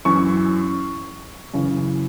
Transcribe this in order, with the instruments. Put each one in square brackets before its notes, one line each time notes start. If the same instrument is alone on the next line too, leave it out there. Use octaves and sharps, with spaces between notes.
[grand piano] F#2 E3 C#6
F#2 C#3 E3